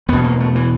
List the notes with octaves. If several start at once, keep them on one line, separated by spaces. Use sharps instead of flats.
E2 B2 B3
A#3
A3
E3